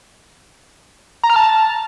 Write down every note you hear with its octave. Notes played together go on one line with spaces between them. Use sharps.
A#5
F6
A5